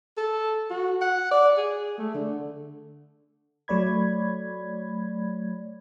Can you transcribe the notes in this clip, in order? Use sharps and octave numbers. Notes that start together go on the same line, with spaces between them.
A4
F#4
F#5
D5
G#4
A3
D3
F#3 A3 C#5 D5 B5 G#6